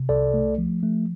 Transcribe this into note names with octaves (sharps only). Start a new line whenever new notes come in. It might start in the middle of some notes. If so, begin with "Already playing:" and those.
Already playing: C3
C2 A4 D5
A3
F3
A3